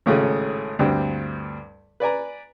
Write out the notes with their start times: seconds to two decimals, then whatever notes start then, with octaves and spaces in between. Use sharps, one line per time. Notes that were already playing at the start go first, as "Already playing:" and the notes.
0.06 G#1 A2 C#3 A3 C#4 G#4
0.79 D2 G2 G3 C4
2.00 B4 D5 G#5 A#5